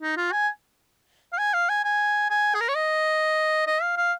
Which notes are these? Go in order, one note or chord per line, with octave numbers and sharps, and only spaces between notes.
D#4
F4
G#5
F5
G#5
F5
G#5
G#5
G#5
G#4
A#4
C#5
D#5
D#5
F5
F5